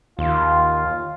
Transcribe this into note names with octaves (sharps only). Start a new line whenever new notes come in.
D#2 F4